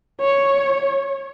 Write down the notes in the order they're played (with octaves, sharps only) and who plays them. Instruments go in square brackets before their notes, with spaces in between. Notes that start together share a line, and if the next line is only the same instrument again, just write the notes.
[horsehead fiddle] C#5